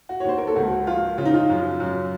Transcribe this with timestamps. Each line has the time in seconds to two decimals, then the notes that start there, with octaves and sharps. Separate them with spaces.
0.09 F#4
0.20 C#5
0.25 D#2 C5
0.38 A#4
0.47 A4
0.56 C#2 F#4
0.87 F3 F4
1.18 C#3 F4
1.25 D#4
1.34 F4
1.49 F#2
1.80 F#2